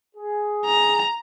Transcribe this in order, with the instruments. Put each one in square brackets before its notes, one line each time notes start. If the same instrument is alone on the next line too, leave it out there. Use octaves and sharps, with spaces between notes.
[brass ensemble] G#4
[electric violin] A#5